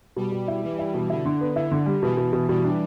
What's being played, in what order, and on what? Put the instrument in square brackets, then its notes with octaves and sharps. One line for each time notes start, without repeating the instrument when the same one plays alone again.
[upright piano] B2 [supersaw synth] G3
[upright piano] B2
E4
[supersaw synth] E3 [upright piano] G3
[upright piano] E4
B2
[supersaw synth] D3 [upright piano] E4
[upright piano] D3
B3
[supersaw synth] D3 [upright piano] E4
[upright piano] D3
G3
[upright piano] B2 [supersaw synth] E3
[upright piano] B2
B2
[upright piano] B2 [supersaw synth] G3
[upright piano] D4